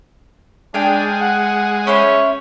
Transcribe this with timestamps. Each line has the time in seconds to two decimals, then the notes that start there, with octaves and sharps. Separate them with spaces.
0.74 G#3 D4 F5 G5
1.21 F#5
1.87 C#4 E4 C5 C#5